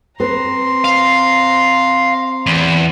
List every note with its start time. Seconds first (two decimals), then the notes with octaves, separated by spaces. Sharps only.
0.20 C4 B4 C5 A#5 C6
0.84 F5
2.46 E2